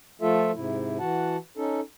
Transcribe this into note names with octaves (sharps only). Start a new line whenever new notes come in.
F3 A3 F4 A4 E5
G#2 C3 E4
E3 F#4 F#5 A5
C#4 D#4 A4